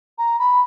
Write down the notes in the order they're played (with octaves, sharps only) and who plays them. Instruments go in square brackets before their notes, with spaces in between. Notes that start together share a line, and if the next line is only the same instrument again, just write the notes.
[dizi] A#5
B5